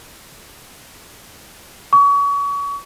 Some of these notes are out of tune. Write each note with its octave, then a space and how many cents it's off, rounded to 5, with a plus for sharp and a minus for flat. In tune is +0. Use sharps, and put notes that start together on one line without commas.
C#6 +35